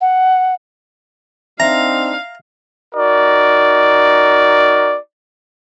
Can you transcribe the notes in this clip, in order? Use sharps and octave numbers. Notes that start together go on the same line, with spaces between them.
F#5
C4 D4 D#4 E5 F5 A#5
D#4 F#4 A#4 D5